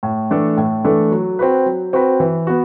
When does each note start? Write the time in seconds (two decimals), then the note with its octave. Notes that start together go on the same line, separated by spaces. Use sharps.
0.03 A2
0.31 E3 A3 D4 A4
0.57 A2
0.84 E3 A3 D4 A4
1.12 F#3
1.39 C4 F#4 B4
1.66 F#3
1.93 C4 F#4 B4
2.20 E3
2.47 B3 F#4